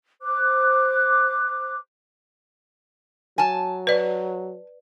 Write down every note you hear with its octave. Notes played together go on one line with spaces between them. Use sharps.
C5 D6 F#6
F#3 G#5 A5
B4 D5